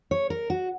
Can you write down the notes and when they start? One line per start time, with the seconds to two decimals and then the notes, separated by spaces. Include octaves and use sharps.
0.11 C#5
0.30 A#4
0.50 F#4